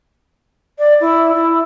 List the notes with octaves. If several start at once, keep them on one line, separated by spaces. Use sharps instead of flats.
D5
E4
E4